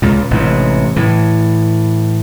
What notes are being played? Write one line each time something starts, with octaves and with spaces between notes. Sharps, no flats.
C#2 A#2
A1 G#2 C3
A2 E3